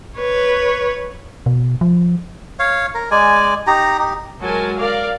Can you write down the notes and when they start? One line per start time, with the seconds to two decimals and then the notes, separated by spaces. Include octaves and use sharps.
0.17 B4 C#5
1.46 B2
1.81 F3
2.59 C#5 F5
2.94 A#4
3.11 G#3 D5 G#5
3.67 D#4 G4 A#5
3.99 D#4 G4
4.42 F#3 G#3 A#4 G#5 A5
4.79 A#4 D5 F5